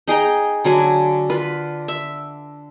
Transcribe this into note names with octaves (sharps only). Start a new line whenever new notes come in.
D#4 G#4 G5 A#5
D3 F#3 F#4 G#5
F4 B4
E5